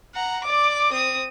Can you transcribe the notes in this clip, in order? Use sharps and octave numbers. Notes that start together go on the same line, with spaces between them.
F#5 A#5
D5 D6
C4 D#6